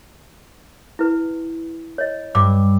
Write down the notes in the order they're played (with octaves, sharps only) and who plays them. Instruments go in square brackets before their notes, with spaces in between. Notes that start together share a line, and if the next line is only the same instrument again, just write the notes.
[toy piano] E4 B4
C#5 D#5
[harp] G2 [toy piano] D6